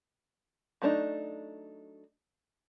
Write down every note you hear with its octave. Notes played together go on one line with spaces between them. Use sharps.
F#3 A3 B3 D4 D#4